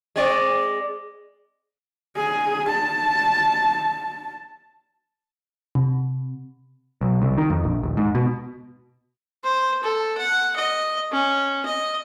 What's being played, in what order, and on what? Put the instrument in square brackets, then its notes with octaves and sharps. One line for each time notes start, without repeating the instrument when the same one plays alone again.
[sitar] G#3 C4 D5
[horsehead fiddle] G#4
A5
[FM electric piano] C3
[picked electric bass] B1
C2
D#3
F2
A#1
D#1
G#2
B2
[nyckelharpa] C5
A4
F#5
D#5
C#4
D#5